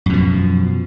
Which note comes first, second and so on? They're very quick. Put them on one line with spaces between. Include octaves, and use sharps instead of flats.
F#2 B2 F3